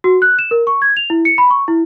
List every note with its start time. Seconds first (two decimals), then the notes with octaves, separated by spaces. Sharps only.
0.04 F#4
0.22 F#6
0.39 E7
0.51 A#4
0.67 C#6
0.82 G#6
0.97 F7
1.10 E4
1.25 C#7
1.38 B5
1.51 C#6
1.68 E4